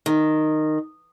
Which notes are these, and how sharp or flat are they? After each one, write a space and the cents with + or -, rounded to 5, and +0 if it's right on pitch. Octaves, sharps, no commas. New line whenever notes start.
D#3 -10